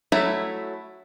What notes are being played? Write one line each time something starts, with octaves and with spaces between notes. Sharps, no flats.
F#3 A3 E4